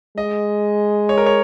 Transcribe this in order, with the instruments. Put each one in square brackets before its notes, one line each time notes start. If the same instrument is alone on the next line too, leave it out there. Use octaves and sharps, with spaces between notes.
[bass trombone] G#3 [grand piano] D#5
[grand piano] C#5
A#4
C#5